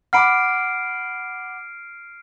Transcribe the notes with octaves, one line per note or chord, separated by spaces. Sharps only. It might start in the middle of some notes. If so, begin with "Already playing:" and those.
F#5 B5 D6 F6 C7 D7